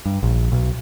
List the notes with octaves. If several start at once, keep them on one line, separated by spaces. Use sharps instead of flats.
G2
A#1
B1